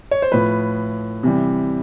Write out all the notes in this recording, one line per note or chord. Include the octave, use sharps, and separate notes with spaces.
C#5
C5
A2 F3 B4
C3 E3 G3